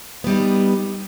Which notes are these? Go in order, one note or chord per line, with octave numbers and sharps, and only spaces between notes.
G3 B3 D#4